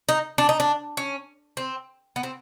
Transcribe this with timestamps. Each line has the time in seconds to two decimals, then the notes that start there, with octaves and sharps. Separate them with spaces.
0.09 D#4
0.38 D4
0.49 D#4
0.60 D4
0.97 C#4
1.57 C4
2.16 B3
2.23 C4